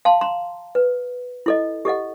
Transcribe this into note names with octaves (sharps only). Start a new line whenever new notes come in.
F5 A5 C6
A#5 C6
B4
E4 A4 D#5
G4 A4 D#5 F#5